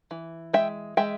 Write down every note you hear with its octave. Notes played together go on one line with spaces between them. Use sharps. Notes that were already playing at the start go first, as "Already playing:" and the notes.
E3
G#3 E5 G5
G#3 E5 G5